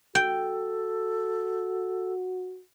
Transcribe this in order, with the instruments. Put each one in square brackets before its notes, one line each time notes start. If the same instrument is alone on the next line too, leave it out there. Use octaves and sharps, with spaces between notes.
[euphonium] F#4 [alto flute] A4 [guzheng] G5